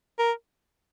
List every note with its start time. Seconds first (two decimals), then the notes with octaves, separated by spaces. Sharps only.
0.19 A#4